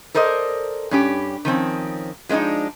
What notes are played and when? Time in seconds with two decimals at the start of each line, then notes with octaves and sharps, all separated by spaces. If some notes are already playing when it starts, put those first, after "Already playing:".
0.14 A4 A#4 C5 D5 D#5
0.91 G2 C#4 G4
1.45 D#3 F3 C4 C#4
2.29 F3 G#3 C4 D4 D#4